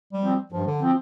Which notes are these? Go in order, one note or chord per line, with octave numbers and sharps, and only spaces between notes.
G3
F3 C4
G2 F3
D3
F3 C4